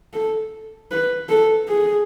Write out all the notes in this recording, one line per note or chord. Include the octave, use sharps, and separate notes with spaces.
A4
B4
A4
G#4